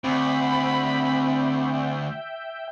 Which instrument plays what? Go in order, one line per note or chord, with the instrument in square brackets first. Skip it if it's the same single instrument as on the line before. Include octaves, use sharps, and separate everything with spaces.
[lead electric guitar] D2 [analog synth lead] C4 [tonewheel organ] E5 G5 [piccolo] B5